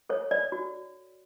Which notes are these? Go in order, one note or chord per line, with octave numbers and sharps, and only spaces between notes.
A4 C#5
C#5 D5
F#4